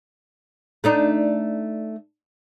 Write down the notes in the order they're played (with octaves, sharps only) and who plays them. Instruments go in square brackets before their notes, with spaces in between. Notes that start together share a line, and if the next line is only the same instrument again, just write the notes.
[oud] A3 D4 D#4